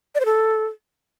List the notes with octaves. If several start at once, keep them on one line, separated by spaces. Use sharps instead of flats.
D5
C5
A4